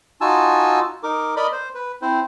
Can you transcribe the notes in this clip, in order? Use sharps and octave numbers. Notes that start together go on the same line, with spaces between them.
D#4 F4 F#4 G#5 A5 E6
D#4 A#4 D6
A#4 D5 D#5 B5
C5
B4
C4 E4 C5